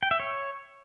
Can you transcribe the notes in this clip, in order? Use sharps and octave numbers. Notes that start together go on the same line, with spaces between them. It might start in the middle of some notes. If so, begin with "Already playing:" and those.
G5
E5
C#5